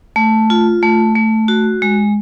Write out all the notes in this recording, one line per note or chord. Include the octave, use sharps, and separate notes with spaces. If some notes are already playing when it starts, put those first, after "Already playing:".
A3
F4
A3
A3
F#4
G#3